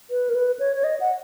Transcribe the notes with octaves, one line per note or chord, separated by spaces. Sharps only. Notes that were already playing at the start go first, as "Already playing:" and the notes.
B4
A#4
B4
C#5
C#5
D#5
F#5